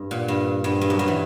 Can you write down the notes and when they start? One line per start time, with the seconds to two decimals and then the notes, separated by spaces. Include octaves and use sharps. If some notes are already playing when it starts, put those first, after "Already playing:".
Already playing: G2
0.11 A#2
0.28 G2
0.64 G2
0.81 G2
0.90 F#2
0.99 G2
1.08 E3